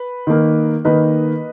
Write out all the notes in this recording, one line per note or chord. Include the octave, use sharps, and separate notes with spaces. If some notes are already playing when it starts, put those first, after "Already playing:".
Already playing: B4
D#3 A#3
D#3 A#3 B4 D#5